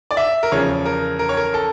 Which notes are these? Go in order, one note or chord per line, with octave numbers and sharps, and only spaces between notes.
D5
E5
A#4
E2 C#3 F3 C#5
A#4
A#4
C#5
A#4
A4